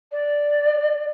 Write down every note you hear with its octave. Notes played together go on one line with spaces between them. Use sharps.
D5